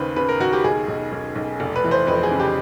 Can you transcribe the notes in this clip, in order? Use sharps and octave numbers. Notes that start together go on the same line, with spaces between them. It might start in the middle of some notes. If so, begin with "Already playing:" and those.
Already playing: D#2 C#3 B4 C5
C#3 B4
A#4
D#2 F#4
G4
B1 G#4
B1
B1
B1
F1
B4
E3
C5
F2 B4
G#4
C#3
G4